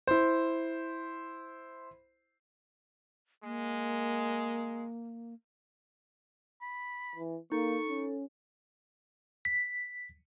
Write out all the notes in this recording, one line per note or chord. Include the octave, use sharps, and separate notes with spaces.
E4 C5
G#3 A#3
B5
E3
A#3 D#4 A4 C#6
C#4
B6